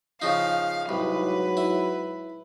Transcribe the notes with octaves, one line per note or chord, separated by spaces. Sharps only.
C#3 F3 D#4 F5
C2 G#2 F#3 B4
E4